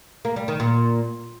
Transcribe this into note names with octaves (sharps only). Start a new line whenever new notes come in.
A#3
G3
D#3
A#2